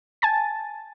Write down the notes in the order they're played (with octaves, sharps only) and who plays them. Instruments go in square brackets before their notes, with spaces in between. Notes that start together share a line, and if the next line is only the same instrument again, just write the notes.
[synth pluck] G#5 A5 A6